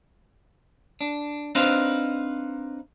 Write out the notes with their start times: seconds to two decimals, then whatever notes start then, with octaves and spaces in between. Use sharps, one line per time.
1.01 D4
1.55 C4 D4 D#4 B4 C5 F5